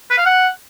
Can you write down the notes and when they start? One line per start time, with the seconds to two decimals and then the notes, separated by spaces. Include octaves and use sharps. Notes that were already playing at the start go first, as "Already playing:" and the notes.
0.10 B4
0.18 F5
0.26 F#5